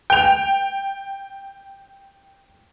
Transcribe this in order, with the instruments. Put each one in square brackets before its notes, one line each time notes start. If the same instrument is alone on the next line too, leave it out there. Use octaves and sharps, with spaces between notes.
[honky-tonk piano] G5 F7